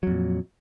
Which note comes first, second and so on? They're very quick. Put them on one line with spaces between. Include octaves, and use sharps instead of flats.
F#3 F2 A#2